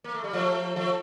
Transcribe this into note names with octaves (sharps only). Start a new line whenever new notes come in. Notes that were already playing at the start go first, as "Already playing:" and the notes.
A#3
A3
G3
F3 A3
F3 A3